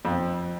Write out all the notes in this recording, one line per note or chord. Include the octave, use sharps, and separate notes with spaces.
F2